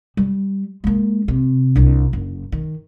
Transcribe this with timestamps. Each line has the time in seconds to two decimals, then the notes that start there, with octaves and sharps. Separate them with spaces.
0.17 G3
0.84 G#3 A#3
1.28 C3
1.76 C2 D4
2.13 F#1
2.52 D#3